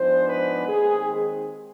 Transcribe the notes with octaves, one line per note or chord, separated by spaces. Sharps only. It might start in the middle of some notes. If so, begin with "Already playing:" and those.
Already playing: G#2 F3 G#3 B3 D4 C5
B4
D#2 D#3 G#3 C4 G#4